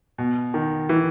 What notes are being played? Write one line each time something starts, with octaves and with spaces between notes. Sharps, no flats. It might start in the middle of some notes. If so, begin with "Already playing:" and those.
B2
D#3
E3